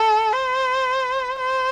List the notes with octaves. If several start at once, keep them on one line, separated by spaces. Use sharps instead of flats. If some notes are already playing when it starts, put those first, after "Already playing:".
Already playing: A4
C5
C5